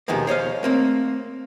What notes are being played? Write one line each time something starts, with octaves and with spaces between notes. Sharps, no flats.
D#2 B2 D#3 F3 G#3 A#3
C5 C#5 D#5 F5
A3 A#3 C4